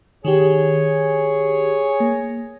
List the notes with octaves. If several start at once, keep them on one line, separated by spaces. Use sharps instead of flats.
D#3 G4 G#4 C#5
A#3